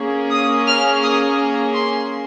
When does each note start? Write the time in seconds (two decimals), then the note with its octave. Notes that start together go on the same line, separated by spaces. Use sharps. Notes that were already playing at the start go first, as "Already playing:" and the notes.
Already playing: A#3 C#4 G#4
0.31 D#6
0.67 F6
1.03 D#6
1.74 C6